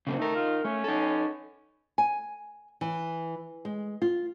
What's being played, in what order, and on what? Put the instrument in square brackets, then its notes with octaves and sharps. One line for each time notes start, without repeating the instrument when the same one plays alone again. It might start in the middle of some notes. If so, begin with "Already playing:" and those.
[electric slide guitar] C#3 A#3 C4
[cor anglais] A3 [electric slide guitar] D#4 A#4
[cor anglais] F4
[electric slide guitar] A3 [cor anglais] C#4
[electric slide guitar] D#4 A4
[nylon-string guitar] G#5
E3
G#3
F4